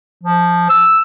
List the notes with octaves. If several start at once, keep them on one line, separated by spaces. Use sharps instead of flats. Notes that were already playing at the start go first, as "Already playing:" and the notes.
F3
E6